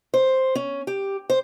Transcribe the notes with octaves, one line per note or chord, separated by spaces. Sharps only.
C5
C#4
G4
C5